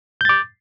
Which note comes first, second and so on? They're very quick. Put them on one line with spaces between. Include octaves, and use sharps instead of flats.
G6 A6 D6